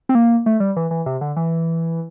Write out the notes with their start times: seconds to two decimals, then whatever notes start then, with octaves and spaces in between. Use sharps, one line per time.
0.09 C4
0.15 A#3
0.46 A3
0.60 G3
0.76 E3
0.91 E3
1.06 C3
1.21 D3
1.36 E3